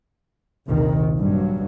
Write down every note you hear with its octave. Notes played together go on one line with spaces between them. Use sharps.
A#1 D#2 C3 D#3
G2 F#3